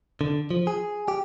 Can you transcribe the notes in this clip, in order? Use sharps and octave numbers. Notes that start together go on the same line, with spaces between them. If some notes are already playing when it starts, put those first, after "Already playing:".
D3
F3
G#4
G4